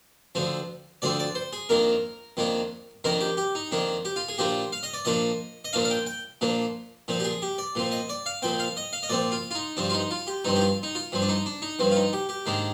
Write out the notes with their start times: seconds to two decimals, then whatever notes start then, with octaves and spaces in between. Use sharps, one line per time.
0.35 D2 D3 F3 C4
1.02 D2 D3 F3 C4 D5
1.19 D5
1.35 C5
1.53 G#4
1.69 F2 D#3 A#3 D4 A#4
2.37 F2 D#3 A#3 D4
3.04 F2 D#3 A#3 D4 A#4
3.21 G4
3.37 G4
3.55 D#4
3.72 F2 D#3 A#3 D4
4.05 G4
4.16 F4
4.28 G#4
4.38 A#2 F3 A#3 D4 G4
4.72 F5
4.83 D#5
4.94 D5
5.05 A#2 F3 A#3 D4 D#5
5.65 D#5
5.73 A#2 F3 A#3 D4 F5
5.84 F5
5.90 G5
6.06 G5
6.41 A#2 F3 A#3 D4
7.08 A#2 F3 C4
7.20 G4
7.24 G#4
7.42 G4
7.58 D5
7.75 A#2 F3 C4
7.92 D#5
8.09 D5
8.26 F5
8.42 A#2 F3 C4 G5
8.59 F5
8.77 D#5
8.93 F5
9.03 D#5
9.09 A#2 F3 C4 D5
9.32 F4
9.51 F4
9.55 D#4
9.77 G2 F3 C4 D4
9.90 F4
9.94 D#4
10.11 F4
10.27 G4
10.44 G2 F3 C4 D#4
10.56 G4
10.61 F4
10.83 D#4
10.95 F4
11.12 G2 F3 C4
11.22 D4
11.29 D#4
11.46 D4
11.62 D#4
11.79 G2 F3 C4
11.91 F4
11.96 D#4
12.13 G4
12.29 G4
12.46 G#2 D#3 A#3 D4